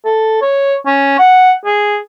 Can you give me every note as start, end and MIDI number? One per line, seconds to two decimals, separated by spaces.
0.05 0.37 69
0.42 0.76 73
0.87 1.17 61
1.19 1.54 78
1.66 1.99 68